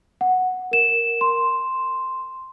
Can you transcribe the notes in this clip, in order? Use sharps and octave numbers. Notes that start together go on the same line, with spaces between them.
F#5
A#4 E7
C6